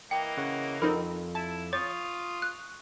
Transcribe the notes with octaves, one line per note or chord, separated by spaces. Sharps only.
E3 A#3 D#5 G5
C#3 C#5 F#5
F2 C4 D#4 A#4 B5
E4 A5
F4 C#5 C#6 D#6 A6
F#6